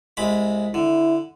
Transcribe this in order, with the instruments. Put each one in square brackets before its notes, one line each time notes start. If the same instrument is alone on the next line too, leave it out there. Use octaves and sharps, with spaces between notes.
[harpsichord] C2 G#3 B5
[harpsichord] D3 [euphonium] E4